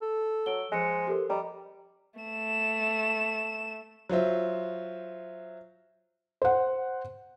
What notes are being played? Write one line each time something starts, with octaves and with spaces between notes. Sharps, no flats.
A4
F#3 E6 D7 G7
F3 G#3 F#6 C#7
G4 A4 A#4
G3 D#5 A#5
A3 E7
F#3 F4 C5 E5
C5 F#5